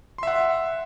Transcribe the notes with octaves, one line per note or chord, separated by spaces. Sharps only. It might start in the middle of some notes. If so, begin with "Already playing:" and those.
E5 F#5 C6